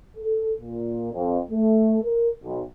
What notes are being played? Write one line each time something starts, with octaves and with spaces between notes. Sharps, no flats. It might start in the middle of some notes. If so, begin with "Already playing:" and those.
A4
A#2
F2
A3
A#4
B1